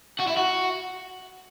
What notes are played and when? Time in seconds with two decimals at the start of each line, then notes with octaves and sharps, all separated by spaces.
0.19 F#4
0.27 E4
0.37 F#4